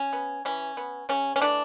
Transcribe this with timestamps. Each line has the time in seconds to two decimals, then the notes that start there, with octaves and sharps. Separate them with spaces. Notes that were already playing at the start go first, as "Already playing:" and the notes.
Already playing: C#4
0.13 B3
0.45 E3 C#4
0.77 B3
1.09 C#3 C#4
1.36 C#4
1.41 E3 A3 D4